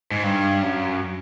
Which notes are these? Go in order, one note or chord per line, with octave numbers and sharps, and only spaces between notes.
G#2
G2
F#2